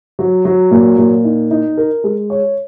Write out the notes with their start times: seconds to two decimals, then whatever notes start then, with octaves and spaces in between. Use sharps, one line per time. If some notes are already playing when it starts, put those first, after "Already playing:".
0.19 F#3
0.45 F#3
0.71 A#2
0.98 A#2
1.24 D#4
1.51 D#4
1.77 A#4
2.04 G#3
2.30 C#5